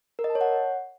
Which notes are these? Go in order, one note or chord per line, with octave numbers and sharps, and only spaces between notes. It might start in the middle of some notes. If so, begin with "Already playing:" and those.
A#4
D#5
A5
C#5
F#5